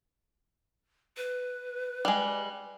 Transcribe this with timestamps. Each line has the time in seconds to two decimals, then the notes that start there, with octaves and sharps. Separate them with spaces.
1.17 B4
2.05 G3 G#3